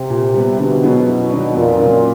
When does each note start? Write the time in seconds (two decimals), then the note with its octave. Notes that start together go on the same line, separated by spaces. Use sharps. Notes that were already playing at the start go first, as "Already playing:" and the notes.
Already playing: C3
0.10 A#2
0.34 G3 B3
0.58 B2 D3
0.82 F#3 B3 E4 G#4
1.07 F#2
1.31 D#3 F#3 B3 D4
1.55 F2 A#2
1.79 C#3 F#3